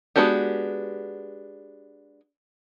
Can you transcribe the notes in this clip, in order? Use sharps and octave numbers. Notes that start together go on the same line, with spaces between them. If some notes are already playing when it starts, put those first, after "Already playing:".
G#3 B3 D4 F#4 G4